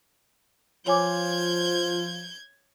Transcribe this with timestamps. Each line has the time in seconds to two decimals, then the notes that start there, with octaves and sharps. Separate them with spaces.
0.87 F3 F4 C#5 G#5 D6 G6 G#6